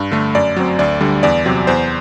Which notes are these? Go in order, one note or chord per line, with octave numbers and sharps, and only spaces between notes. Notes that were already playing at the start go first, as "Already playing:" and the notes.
Already playing: G2
D3 A3
F#2 D5
F#3 C4
D2 D5
D3 G3
E2 D5
C3 F#3 C4
E2 C5